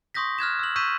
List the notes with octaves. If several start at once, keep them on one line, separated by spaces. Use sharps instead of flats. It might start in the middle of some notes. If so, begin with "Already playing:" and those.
C6 C#6 D#6 G6 A#6 B6
F6 F#6 G#6 E7
E6 F#7
C#6 E6 G6 B6 D#7 E7